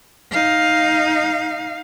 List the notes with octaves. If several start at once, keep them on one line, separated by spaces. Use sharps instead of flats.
D#4 F5